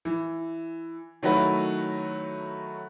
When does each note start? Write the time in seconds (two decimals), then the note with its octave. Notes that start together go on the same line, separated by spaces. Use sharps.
0.05 E3
1.23 D#3 F#3 A3 E4 F#4 B4